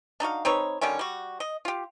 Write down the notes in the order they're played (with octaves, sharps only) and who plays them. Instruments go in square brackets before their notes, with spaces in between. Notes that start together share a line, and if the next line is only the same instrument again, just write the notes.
[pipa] D4 D#4 F#4 F5
C4 D#4 B4 C#5
D3 D#3 G3 C#4
G3 F#4
D#5
F4 G4